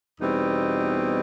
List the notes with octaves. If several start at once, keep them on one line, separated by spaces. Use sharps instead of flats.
E2 B2 G3 C4 D#4